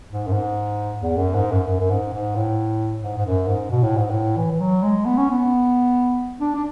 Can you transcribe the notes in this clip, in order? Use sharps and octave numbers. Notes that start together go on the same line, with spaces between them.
G#2
F#2
G#2
E2
F#2
G#2
F#2
F#2
F#2
G#2
G#2
A2
G#2
G#2
F#2
G#2
B2
A2
G#2
A2
E3
E3
F#3
G#3
B3
C#4
B3
D4
D4